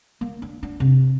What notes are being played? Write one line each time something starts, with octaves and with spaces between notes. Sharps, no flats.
A#3
D4
D4
C3